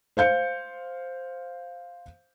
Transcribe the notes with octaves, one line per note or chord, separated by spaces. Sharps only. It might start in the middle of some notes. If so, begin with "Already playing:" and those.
C5 F5 G6 C#7